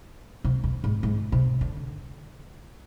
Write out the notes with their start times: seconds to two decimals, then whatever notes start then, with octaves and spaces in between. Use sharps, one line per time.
0.44 C3
0.64 F2
0.84 G#2
1.03 G#2
1.32 C3
1.61 D3